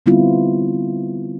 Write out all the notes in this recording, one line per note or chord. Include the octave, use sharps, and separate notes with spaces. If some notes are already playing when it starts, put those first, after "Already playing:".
D3 G3 B3 C4 E4 F4